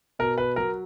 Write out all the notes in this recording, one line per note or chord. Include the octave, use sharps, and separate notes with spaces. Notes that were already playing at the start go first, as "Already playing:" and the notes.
B2 A#4
B4
F#3 A#4